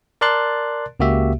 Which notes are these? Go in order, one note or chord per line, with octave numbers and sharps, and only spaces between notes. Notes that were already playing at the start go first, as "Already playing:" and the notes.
A#4 D5 A5 C6 F#6 A6
C#2 C#3 A#3 F#4 G4 E5